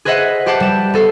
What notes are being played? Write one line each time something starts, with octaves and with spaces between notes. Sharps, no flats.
G#4 B4 C5 D#5 E5 F#5
G4 C5 F#5 A5 D6 G6
G3 E7
B3 A4 C5